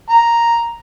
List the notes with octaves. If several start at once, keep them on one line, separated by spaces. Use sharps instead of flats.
A#5